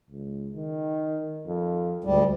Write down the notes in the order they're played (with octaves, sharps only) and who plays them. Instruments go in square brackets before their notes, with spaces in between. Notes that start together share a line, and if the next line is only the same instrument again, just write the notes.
[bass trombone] C#2
D#3
F2
[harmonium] D2 G3 [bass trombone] G#2